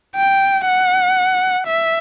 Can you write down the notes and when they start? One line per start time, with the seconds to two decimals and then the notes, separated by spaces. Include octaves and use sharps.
0.15 G5
0.65 F#5
1.67 E5